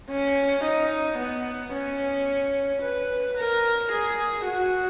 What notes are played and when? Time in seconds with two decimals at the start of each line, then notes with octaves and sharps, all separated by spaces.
0.10 C#4
0.64 D#4
1.18 B3
1.73 C#4
2.82 B4
3.37 A#4
3.92 G#4
4.46 F#4